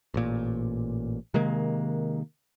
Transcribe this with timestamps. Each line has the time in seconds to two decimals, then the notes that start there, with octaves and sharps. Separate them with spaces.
0.14 A1 A#2
1.34 C3 D#3 G#3 A#3